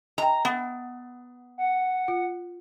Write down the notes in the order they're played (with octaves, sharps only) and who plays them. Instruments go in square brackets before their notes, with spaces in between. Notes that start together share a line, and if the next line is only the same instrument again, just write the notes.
[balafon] D#5 G5 [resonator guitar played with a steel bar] A#5
[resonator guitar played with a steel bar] B3
[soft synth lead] F#5
[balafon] F4